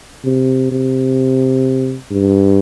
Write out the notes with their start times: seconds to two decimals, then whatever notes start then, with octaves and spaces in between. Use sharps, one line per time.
0.25 C3
0.72 C3
2.11 G2